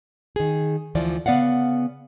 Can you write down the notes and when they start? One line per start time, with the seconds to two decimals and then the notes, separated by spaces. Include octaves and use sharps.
0.36 D#3 G#4
0.95 D2 E3 F3 F4 D5
1.26 C#3 B3 D5 F5 F#5